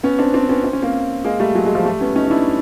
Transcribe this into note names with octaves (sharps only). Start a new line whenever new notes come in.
B3 C#4
C4 D4
C4 D4
B3 C#4
C4
C#4
A#3 C4
G#3 A#3
G3 A3
F#3 G#3
F#3 G#3
F3 G3
G3 A3
B3 C#4
C#4 D#4
D#4
D4 E4